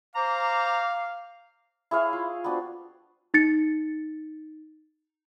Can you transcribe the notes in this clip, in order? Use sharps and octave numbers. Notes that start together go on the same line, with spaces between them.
C5 F5 A#5 D6
E4 G#4 C#5 F5
F4
B3 C4 D4 F#4
D#4 A6 C#7